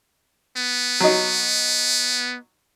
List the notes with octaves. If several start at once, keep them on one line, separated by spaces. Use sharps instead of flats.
B3
F#3 D#4